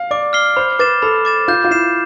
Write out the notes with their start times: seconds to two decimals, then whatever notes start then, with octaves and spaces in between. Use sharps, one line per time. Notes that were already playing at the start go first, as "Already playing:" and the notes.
Already playing: F5
0.11 D5 D6
0.33 F6 C7 G7
0.56 C5 B5
0.79 B4 D6 A6 E7
1.02 A4 B5
1.25 D6 A6 E7
1.48 F4 G6
1.65 F4
1.71 E4 C7 E7